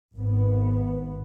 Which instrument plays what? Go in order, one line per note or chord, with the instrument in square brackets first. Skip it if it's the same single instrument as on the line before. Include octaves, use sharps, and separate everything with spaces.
[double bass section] G#1 B3